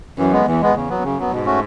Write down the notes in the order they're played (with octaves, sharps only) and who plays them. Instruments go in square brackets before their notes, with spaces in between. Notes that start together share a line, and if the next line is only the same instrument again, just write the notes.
[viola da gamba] F#2 [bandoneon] E3
[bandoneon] G#3 B3
[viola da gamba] E2 [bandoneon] E3
[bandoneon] G#3 B3
[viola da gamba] E2 [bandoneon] C#3
[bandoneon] F#3 B3
[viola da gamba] F#2 [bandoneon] C#3
[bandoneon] F#3 B3
[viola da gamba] G#2 [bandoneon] B2
[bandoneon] A3 C#4 F#4